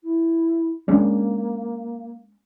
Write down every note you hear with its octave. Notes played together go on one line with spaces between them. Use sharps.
E4
G#3 A#3 C#4 D4